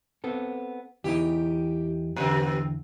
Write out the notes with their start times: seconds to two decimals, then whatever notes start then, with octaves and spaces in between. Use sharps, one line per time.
0.24 B3 C4 A4
1.04 E2 E3 D#4 G4
2.16 E2 A#2 D3 C4